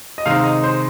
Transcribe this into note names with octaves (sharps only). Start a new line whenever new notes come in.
D#5
C3 D#3 G#3 C4 D#4 F5
D#5
C5